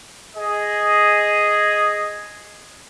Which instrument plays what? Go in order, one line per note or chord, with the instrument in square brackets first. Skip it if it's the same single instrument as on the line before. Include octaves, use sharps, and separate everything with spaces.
[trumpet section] G#4 D#5